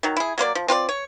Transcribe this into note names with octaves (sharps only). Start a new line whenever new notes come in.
D#3 F#3
E4 G#4
F#3 A#3 C5 D5
F3
C4 F4 B4 D5
C#5